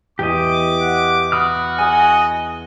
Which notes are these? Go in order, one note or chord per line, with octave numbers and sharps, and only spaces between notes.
E2 G4 D#5 D6
F#5
F#4 B5 D#6 F6
G#4 D#5 G#5